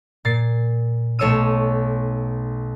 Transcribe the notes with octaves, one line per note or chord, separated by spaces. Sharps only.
A#2 A6 C7
B1 A3 C#5 D#6 E6 D#7